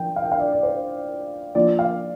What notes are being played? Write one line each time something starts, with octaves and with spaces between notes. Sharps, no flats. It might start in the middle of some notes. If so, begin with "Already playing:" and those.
Already playing: F3 D4 F4 G5
F5
G5
F5
D5
D5
C5
F3 A#3 F4 D5
F5